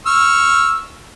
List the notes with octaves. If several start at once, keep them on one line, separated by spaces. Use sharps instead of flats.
C#6 E6 F6